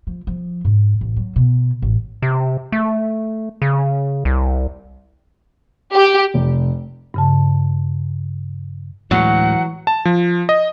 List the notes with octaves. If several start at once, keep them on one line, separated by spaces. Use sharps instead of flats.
F3
F3
G#2
A1
F#3
B2
A1
C3
A3
C#3
C2
G4
F1
G2 C#3 A5
D2 A2 E3 F#3 G#3 F#5
A5
F3
D#5